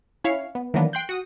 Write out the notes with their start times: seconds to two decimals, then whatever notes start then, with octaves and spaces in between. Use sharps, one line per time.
0.24 C#4 E4 C#5 F5
0.55 B3
0.74 D#3 E3 F#3 A#3 B3 D4
0.93 G5 C6 F#6 G6
1.09 F#4 D#6